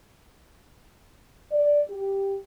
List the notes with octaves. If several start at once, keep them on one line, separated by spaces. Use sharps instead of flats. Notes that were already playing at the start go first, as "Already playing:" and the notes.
D5
G4